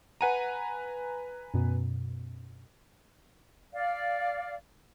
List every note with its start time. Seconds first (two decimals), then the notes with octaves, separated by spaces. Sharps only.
0.21 B4 F#5 G#5 A#5 D#7
1.54 F#2 B2
3.73 D5 F5